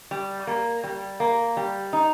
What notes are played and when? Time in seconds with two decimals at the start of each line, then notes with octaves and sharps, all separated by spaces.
0.11 G3
0.47 A#3
0.84 G3
1.20 A#3
1.57 G3
1.93 D#4